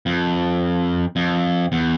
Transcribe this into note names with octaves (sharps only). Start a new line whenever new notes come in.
F2
F2
E2